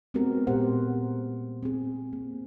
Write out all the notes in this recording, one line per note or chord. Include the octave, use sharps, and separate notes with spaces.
G#3 B3 C4 F#4 A#4
A#2 G4 A#4 C5 F#5
C4 G#4
A#3